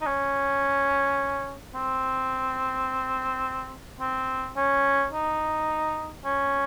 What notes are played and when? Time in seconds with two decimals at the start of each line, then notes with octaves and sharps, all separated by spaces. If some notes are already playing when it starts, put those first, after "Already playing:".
0.01 D#4
0.06 C#4
1.74 C4
4.00 C4
4.56 C#4
5.12 D#4
6.25 C#4